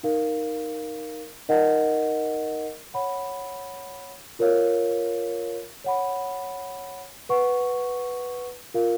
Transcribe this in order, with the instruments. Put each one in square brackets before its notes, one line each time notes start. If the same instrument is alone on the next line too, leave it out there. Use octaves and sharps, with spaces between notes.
[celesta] D#4 A#4 F5
D#4 A#4 D#5 F#5
C#5 F#5 B5
F4 A#4 C#5 F5
C#5 F#5 B5
B4 F#5 C#6
F4 A#4 F5